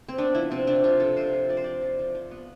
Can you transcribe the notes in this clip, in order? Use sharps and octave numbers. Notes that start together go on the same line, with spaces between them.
C4
B3 D4
F3 E4
C3 C4
C3 D4
C3 F4
F3 A4
C3 C5
F3
F3 D5
C5
F3 D5
F3
F3
F3
B3